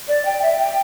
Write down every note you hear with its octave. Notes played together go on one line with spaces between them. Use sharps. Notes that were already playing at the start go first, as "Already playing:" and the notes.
D5
G5
E5
G5